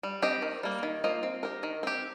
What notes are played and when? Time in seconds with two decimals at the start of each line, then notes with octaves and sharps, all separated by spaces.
0.03 G3
0.22 C4 G4 D#5
0.42 D#3
0.63 G3 A#3
0.83 D#3
1.04 A#3 F4 C5 D#5
1.23 C4
1.43 G4 A#4
1.63 D#3
1.83 C4 G4